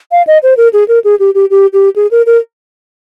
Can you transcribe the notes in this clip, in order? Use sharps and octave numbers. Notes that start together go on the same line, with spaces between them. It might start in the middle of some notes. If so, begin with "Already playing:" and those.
F5
D#5
C5
A#4
G#4
A#4
G#4
G4
G4
G4
G4
G#4
A#4
A#4